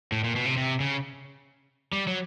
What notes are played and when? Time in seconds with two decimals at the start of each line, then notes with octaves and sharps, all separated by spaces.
0.12 A2
0.24 A#2
0.36 B2
0.46 C3
0.57 C3
0.80 C#3
1.93 G3
2.07 F#3